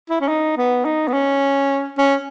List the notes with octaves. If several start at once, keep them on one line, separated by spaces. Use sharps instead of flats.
E4
C#4
D#4
B3
D#4
B3
C#4
C#4